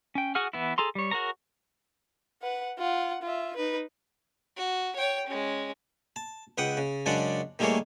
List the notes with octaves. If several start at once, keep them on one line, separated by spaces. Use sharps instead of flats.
C#4 G5
F#4 G#4 F#5 G#5 F6
E3 B3 E4
G#4 A4 A#5 C6
G3 C#5
F#4 G#4 A#4 C#5 A#5
B4 F#5
F4 F#5
F4 E5
D#4 B4
F#4
C#5 G5
G#3 C#4
A5
C#2 B4 F#5 G5 D#6
C#3
F#2 C#3 G#3 D4 D5 F#5
D#3 G3 A3 A#3 G#4 C#5